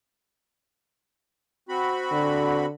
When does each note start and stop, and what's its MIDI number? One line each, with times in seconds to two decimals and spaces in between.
1.69 2.66 60
1.69 2.66 66
1.69 2.66 83
2.12 2.73 50